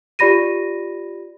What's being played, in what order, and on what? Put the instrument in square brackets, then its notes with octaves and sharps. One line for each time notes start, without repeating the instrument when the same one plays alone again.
[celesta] F4 G4 D5 B5 A#6 D#7